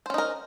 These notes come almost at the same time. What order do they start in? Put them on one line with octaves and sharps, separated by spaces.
C5 C#4 D#4 A#4